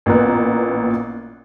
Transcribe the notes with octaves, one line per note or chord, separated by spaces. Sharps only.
A1 A#2 A#3 B3 A#5 F#6